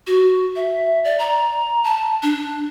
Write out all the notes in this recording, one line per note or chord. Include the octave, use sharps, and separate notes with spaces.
F#4
E5
D5
A#5
A5
D4